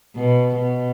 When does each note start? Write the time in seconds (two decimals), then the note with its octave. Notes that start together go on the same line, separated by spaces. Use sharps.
0.16 B2
0.55 B2